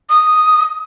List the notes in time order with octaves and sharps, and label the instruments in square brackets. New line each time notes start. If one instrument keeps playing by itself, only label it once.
[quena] D#6